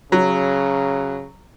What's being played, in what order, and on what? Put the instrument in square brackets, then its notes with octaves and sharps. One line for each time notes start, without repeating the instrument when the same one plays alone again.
[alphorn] C#3 [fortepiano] F#3